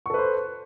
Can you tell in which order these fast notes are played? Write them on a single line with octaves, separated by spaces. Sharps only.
C#6 A4 B4 C5